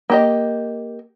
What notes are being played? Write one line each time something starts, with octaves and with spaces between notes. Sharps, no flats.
A#3 G4 D#5